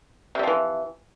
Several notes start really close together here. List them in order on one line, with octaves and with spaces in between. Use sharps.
C3 G3 F3 E3